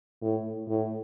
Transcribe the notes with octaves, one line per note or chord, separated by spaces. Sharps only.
A2
A2